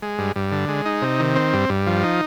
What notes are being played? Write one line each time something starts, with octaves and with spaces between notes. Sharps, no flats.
G#3
G2
G2
D3
G#3
D#4
C3
D#3
C4
G2
G2
F3
D#4